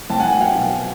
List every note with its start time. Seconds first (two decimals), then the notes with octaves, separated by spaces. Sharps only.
0.10 C2 G5 A5
0.20 F#5 G#5
0.25 C2
0.30 F#5 G#5
0.41 F#3 F5 G5
0.56 B2